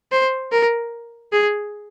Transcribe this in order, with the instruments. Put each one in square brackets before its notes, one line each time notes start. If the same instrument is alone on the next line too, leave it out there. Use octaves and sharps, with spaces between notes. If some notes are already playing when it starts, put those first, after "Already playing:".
[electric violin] C5
A#4
G#4